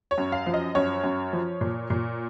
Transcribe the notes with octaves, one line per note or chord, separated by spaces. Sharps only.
C#5
F#2
F5
F3
D#5
F#2 C#5
F#2
F3
A#2
A#2